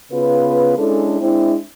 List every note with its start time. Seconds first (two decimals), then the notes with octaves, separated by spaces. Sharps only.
0.12 C#3 B3 F4 B4
0.78 G#3 C#4 D4 E4 A4
1.21 G#3 C4 D4 E4